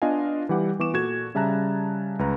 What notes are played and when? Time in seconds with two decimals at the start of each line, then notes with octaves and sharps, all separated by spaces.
0.02 B3 D4 F4 D#5 F5 G#5
0.49 E3 G3 G4 F#5 D6
0.79 E3 B3 C#6 D6 E7
0.93 A#2 F#4 A4 G#6 E7
1.35 C#3 G3 E5 A5 A#5 F#6
2.19 C#2 B4 A#5